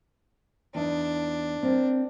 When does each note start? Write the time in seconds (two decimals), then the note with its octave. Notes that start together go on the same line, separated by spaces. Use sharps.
0.75 E2 D4 D#4
1.63 C4 A#4 D5